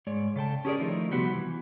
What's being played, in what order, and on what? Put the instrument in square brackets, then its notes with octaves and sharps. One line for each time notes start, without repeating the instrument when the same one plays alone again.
[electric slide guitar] G#2 G#3 C#5 D5
C#3 A4 G5 A5
C#4 G4 G#4 A#4 D5
D#3 F3 A3 D#4 E4 A#4
C3 F3 G3 B3 F#4 G4
E3